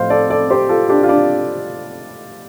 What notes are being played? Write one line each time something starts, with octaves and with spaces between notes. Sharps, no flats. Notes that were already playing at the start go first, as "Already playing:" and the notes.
Already playing: A2 F3 C5 F5
A4 D5
A4 D5
G4 C5
F4 A4
D4 G4
F4
D4